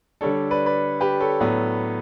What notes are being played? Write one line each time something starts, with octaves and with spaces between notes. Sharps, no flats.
D3 G3 D4 A4 C#5
B4 D5
B4 D5
G4 B4
A4 C#5
A2 F#3 B3 D4